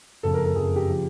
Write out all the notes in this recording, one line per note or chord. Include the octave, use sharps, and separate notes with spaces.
F#1 F2 C#3 A4
A#4
A4
F#1 F2 C#3 G#4
G4
C#3 F3